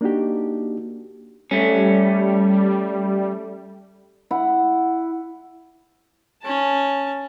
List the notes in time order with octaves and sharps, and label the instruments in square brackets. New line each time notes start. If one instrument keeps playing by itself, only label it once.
[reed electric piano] A#3 D4 D#4 F#4 G4
[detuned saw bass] G3 [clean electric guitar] A3 C#4
[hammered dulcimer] E4 F#5
[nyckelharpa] C#4 A5